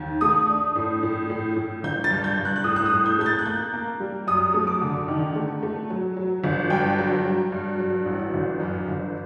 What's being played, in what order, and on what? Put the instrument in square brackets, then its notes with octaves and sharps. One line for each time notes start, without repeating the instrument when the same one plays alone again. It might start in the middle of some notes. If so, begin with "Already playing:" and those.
Already playing: [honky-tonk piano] D#2
A3 D#6
D4
A2
A2
A2
A2
G1 G6
A6
G2
G6
G2
F#6
F#6
A2 D#6
F#6
D#6
A2
G6
A3 G6
A6
F#6
A#3 G6
A#3
G3
F#2 D#6
A3
D6
D3
D#3
A3
A3
F#3
F#3
G1
G2 G5
F#3
F#3
G2
F#3
A1
G1
F#2
G1